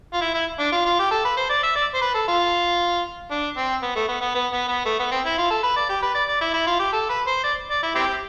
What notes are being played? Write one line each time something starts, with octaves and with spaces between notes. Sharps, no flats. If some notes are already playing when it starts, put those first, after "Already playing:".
F4
E4
E4
D4
F4
F4
G4
A4
B4
C5
D5
E5
D5
C5
B4
A4
F4
D4
C4
B3
A3
B3
B3
B3
B3
B3
A3
B3
C4
E4
F4
A4
B4
D5
G4
B4
D5
D5
E4
E4
F4
G4
A4
B4
C5
D5
D5
E4
C4 E4 G4